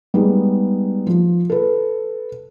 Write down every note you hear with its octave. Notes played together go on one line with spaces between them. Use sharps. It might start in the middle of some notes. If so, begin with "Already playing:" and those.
G3 G#3 B3 D#4
F3
A4 B4